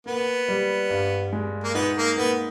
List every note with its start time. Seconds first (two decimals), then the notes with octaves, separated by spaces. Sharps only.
0.06 A#3 B3
0.48 G3
0.90 G2
1.33 G#3
1.64 A#3
1.74 B3 D#4
1.96 A#3
2.16 A#3 B3